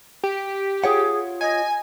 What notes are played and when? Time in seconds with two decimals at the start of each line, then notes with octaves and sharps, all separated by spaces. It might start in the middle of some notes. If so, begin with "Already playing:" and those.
0.24 G4
0.84 F4 G#4 C#5 F#5
1.41 D#5 G#5